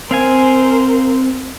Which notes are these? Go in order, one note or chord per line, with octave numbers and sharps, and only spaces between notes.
C4 A#4 C5 F5 G#5